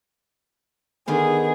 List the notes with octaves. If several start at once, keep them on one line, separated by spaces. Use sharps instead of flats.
D3 D#3 B3 G#4